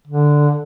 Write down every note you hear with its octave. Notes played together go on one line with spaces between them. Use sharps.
D3